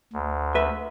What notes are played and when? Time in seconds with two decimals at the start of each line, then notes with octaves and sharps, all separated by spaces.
0.13 D2
0.55 B4 E5